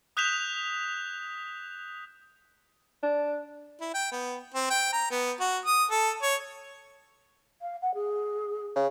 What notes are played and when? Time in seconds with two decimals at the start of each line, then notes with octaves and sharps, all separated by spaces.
0.17 D#6 F#6 G6 B6 E7 F7
3.03 D4
3.81 E4
3.94 G5
4.12 B3
4.54 C4
4.70 G5
4.93 A#5
5.11 B3
5.40 F#4
5.66 D#6
5.91 A4
6.23 C#5
7.61 F5
7.82 F#5
7.94 G#4
8.76 C#3